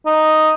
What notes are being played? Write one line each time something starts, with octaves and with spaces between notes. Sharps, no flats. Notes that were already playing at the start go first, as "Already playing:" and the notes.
D#4